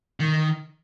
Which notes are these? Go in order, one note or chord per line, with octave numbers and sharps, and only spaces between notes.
D#3